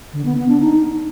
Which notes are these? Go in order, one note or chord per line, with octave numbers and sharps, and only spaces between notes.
D3
B3
B3
D4
D#4